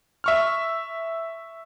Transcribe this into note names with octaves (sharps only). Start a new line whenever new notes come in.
E5 C#6 F6